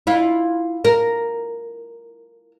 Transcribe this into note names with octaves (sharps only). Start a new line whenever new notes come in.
E4 F4
A#4